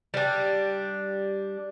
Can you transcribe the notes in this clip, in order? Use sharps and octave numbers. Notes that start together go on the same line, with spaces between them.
G3 D4